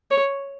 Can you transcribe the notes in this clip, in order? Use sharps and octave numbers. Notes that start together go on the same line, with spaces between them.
C#5